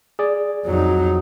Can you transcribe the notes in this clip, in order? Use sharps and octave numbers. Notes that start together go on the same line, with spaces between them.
G#4 D5
F2 F#3 D#4